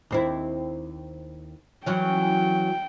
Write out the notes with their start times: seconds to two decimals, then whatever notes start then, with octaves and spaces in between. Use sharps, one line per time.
0.11 D#2 C4 E4
1.86 E3 F#3 C#4 G5